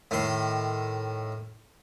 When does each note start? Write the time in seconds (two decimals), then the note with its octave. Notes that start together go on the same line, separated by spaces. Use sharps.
0.11 A2 D#3 C6